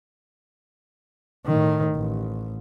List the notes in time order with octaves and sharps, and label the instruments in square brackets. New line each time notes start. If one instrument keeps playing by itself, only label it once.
[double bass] A2 D#3
A1